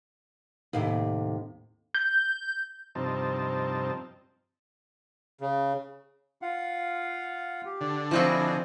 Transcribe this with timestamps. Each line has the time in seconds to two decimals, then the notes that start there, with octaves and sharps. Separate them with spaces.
0.73 D#2 A2 C3
1.95 G6
2.95 G2 C3 F3 C4 D#4 A5
5.41 C#3
6.42 F4 F5 F#5
7.65 G4
7.81 D3
8.11 F3 C4 E4 F#4 C5 D#5 G#5